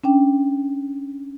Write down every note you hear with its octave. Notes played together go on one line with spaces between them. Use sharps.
C#4 D4 G5